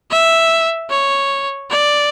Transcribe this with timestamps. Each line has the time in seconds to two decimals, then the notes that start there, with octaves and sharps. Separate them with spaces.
0.11 E5
0.90 C#5
1.70 D5